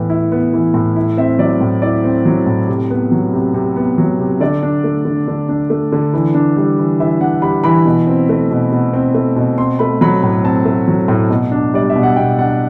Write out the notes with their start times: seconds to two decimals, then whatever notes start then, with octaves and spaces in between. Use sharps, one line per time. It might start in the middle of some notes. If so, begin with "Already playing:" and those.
Already playing: A2 E3 B3
0.10 E4
0.32 B3
0.53 E3
0.74 A2
0.96 E4
1.17 C4 E5
1.39 F#3 D5
1.61 A2
1.82 E4 D5
2.04 C4
2.26 F#3
2.46 A2
2.68 C3
2.90 B3
3.12 F#3
3.33 C3
3.54 C3
3.76 B3
3.98 F#3
4.19 C3
4.40 D3 D5
4.63 D4
4.84 A3
5.05 D3
5.28 D3
5.49 D4
5.70 A3
5.92 D3
6.13 E3
6.35 D4
6.56 G3
6.79 E3
7.00 E3 E5
7.21 D4 F#5
7.42 G3 B5
7.64 E3 B5
7.85 B2
8.07 C4
8.29 A3
8.51 B2
8.72 B2
8.94 C4
9.14 A3
9.36 B2
9.58 C4 C6
9.79 A3 B5
10.01 F#3 B5
10.23 A2 B5
10.44 C4 A5
10.65 A3
10.88 F#3
11.08 A2
11.30 B2
11.51 D4
11.74 G3 D5
11.90 E5
11.96 B2
12.03 F#5
12.16 B2 G5
12.39 D4 F#5